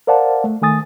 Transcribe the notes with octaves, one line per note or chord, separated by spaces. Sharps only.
A#4 C5 D5 F5 F#5 A5
A3
D#3 A3 G#5 D#6 A6